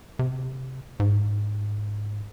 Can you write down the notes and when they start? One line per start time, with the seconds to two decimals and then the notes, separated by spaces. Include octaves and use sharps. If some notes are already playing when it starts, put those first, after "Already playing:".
0.19 C3
1.00 G#2